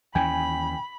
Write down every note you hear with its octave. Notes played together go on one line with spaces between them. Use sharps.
D#2 E3 C#4 G5 G#5 B5